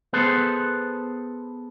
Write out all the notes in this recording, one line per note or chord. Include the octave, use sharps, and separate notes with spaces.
B3 G#4 A4 B4 C5